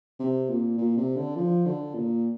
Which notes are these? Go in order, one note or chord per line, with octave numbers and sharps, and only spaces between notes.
C3
A#2
A#2
C3
D3
F3
D3
A#2